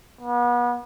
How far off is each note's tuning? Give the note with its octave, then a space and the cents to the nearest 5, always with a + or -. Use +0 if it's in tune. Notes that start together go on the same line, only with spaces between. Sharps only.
B3 -35